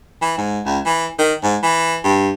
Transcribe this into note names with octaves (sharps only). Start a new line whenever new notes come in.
E3
G#2
C#2
E3
D#3
G#2
E3
G2